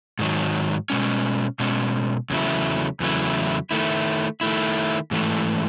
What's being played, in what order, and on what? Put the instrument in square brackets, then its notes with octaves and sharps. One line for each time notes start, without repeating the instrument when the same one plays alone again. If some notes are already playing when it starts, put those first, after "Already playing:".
[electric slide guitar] G#2 D#3 F#3
B2 G#3 C#4
B2 G#3 C#4
E2 C#3 F#3 A3 E4
E2 C#3 F#3 A3 E4
D#3 A3 E4
D#3 A3 E4
G#2 E3 A3